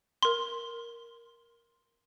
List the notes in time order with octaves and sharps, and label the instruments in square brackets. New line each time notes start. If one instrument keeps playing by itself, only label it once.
[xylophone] A#4 C6